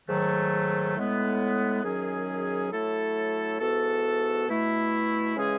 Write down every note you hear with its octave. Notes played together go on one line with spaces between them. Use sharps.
G#2 D#3 F#3 A3
A2 G#3 B3
F#2 D#3 F#3 C#4 G#4
A2 F#3 A3 E4 A4
G#2 E3 B3 F#4 A4
B2 A3 E4
C#3 E3 G#3 C#4 G#4